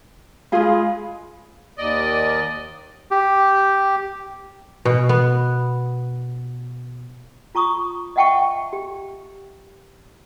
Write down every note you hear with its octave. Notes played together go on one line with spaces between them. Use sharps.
G#3 F4 G#4 F5 B5
D#2 D5 D#5
G4
B2
B3
F4 A#5 C#6 D#6
D#5 E5 F#5 G5 A5 C#6
G4